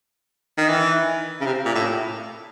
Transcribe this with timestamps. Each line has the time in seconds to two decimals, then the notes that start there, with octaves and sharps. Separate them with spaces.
0.57 D#3
0.69 E3
1.41 C#3
1.46 C3
1.65 A#2
1.75 A2